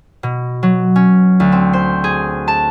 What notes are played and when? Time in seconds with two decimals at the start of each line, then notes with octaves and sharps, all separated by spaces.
0.23 B2
0.63 F#3
0.96 C#4
1.40 D2
1.52 C4
1.73 C5
2.04 G#4
2.48 A5